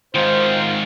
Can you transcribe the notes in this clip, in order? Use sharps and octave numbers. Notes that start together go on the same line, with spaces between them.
G#2 D#3 C4 F4 C5